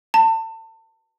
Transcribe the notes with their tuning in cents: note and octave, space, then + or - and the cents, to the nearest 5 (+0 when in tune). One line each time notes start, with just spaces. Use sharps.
A5 +30